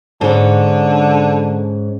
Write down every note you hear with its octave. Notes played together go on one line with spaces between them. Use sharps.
G#2 D3 C#4